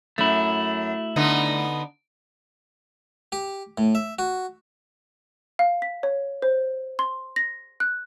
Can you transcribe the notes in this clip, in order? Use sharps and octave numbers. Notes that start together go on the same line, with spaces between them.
F#2 A3 E4
D3 B3 D#4
G4
A2
E5
F#4
F5
B6
C#5
C5
C6
A#6
F#6